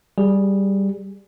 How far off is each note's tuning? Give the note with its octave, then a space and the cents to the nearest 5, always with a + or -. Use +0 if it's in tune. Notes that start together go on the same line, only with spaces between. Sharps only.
G3 +0 G#4 -10